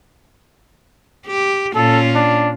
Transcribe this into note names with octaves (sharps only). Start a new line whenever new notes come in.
G4
A#2 C#4 F4 A4
D4